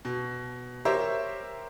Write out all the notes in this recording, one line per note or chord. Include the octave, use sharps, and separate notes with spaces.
B2
G4 A#4 C5 C#5 E5